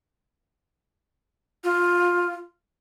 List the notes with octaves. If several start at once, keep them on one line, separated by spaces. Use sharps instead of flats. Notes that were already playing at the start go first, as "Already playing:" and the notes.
F4